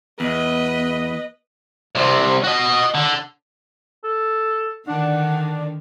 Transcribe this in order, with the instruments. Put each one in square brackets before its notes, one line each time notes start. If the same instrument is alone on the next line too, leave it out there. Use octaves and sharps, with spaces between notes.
[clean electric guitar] E2 [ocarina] B3 [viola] B4 D#5
[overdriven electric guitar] C2 C3
F#4 D#5
D3
[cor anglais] A4
[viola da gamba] D3 D#3 [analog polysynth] D4 [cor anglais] F#5